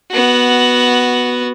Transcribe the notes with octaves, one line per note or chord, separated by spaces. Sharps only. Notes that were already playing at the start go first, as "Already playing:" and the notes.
B3 F#4